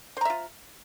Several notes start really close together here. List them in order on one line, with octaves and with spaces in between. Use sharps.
C5 A#5 E5 F4